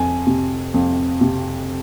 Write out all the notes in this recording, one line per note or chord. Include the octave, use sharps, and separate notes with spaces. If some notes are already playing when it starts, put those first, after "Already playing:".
Already playing: F2 G#5
C3
F2
C3